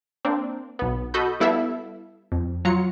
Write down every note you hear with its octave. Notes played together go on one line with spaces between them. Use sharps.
A#3 C4 D4
B1 B3
F#4 A4 D#5 B5 G6
G3 B3 E4 A4 E5 F5
F2
F#3 F4 A#5 C#7